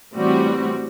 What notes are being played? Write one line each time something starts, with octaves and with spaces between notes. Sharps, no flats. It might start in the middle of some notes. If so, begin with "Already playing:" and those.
A2 E3 G3 C4 F#4